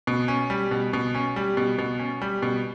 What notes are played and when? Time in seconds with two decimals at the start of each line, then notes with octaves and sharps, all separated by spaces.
0.07 B2
0.28 C#4
0.50 G3
0.71 B2
0.93 B2
1.15 C#4
1.36 G3
1.57 B2
1.78 B2
1.99 C#4
2.22 G3
2.42 B2